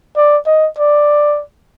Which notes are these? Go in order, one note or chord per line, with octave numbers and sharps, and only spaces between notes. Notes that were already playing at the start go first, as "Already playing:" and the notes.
D5
D#5
D5